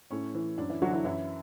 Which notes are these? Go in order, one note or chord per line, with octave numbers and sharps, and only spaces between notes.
A2 C#4
E3
F#2 D4
E3 E4
D3 F#3 F#4
E3 E4
F#2 E3 E4